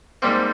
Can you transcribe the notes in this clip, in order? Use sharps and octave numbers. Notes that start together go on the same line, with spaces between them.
G#2 G3 A#3 C4